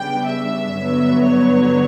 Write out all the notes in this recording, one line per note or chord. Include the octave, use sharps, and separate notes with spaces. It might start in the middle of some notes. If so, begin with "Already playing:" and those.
Already playing: C#3 G3 B3 D4 G5
E5
G2 D3 F#3 B3
C#5